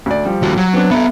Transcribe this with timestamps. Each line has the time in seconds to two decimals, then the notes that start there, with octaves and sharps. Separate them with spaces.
0.06 D2 D5
0.25 F3 G3
0.42 D#2 F#4
0.57 F#3
0.73 B3 C4 D4
0.91 B3 A4 E5